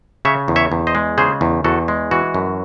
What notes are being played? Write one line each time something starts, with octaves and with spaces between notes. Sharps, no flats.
C#3 C#5 E5
E2
C#5 E5
E2
C5 D#5
G#3
C#3 G#4 C5
E2
E2 F#4 A4
G#3
E3 F#4
F#2